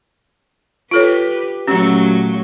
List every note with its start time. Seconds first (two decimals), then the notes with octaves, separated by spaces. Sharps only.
0.91 F4 G4 A4 B4 C#5
1.68 A#2 F#3 A3 C#4 G4